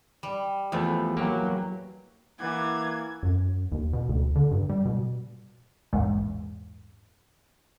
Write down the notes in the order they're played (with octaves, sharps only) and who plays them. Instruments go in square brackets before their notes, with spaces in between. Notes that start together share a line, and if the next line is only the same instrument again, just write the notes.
[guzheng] G3
[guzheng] E2 [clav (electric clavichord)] F3 A3 B3
[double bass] F#3 [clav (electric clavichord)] A#3 G4
[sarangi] E3 [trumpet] A#3 [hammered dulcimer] B4 D5 F#5 [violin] G#6
[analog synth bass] F#2
D#2
B2
D2
D3
G2
G3
B2
[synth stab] A#1 E2 G#2